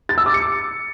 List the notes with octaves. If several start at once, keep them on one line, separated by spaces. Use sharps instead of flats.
A6
E6
D6
C#7